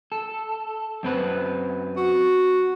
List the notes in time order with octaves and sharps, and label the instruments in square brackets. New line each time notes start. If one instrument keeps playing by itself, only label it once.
[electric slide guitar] A4
F#2 C4 B4
[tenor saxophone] F#4